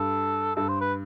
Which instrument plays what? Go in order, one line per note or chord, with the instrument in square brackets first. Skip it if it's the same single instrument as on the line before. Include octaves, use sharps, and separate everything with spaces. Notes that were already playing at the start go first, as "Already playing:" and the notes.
Already playing: [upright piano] G2 [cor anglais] A4
[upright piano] G2 [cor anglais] A4
[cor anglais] C5
B4